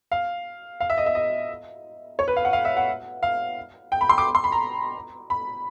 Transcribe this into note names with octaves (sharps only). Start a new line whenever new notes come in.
F5
F5
E5
D#5
E5
D#5
C#5
B4
F5
F#5
F5
E5
F#5
F5
G5
B5
C6
D6
C6
B5
A#5
B5